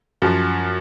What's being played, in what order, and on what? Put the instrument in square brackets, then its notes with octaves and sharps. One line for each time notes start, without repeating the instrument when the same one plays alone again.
[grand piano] F#2 F3